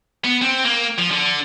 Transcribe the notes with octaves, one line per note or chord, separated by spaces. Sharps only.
B3
C4
A#3
F3
D3